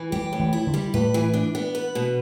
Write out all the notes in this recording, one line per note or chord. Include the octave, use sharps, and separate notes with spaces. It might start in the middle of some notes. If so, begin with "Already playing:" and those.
Already playing: E3
G3 G4
A2
E3
E4
D3
G3
A2 B4
E3
D4
B3
B4
B2